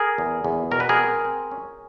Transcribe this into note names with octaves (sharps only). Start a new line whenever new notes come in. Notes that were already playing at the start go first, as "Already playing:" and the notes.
Already playing: G#4 A#4
E2
E2
B2 A#4
B4
G#4 A#4
C4
C4
C#4